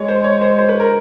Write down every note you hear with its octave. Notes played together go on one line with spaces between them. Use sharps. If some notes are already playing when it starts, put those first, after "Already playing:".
Already playing: G#3 C#5
C5
C#5
C5
C5
B4
A#4